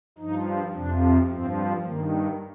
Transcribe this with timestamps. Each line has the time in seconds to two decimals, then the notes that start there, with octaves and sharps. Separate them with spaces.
0.18 G2 F3 D#4
0.73 F2 C3 F3 D4
1.29 G2 F3 C4
1.84 G2 D#3 A#3